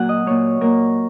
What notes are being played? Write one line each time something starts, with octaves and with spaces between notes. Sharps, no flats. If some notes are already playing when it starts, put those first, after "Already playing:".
Already playing: A#2 F#3 A#3 F#5
D#5
A#2 A#3 C#5
A#2 A#3 A#4